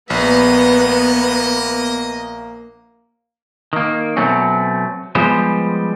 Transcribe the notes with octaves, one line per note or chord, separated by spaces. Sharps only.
A#1 A#3 B3 D#5
D#3 A#3
B2 F#3 A3 C4 C#4
F3 G3 G#3 B3 G4 C5